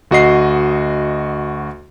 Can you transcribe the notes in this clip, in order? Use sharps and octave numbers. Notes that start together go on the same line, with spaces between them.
D2 F#4 D#5 C7